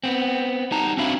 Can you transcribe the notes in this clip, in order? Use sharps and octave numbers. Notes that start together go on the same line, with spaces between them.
B3 C4
G3 D#4 A5 A#5
C4 D4 F#4 E5 F5 B5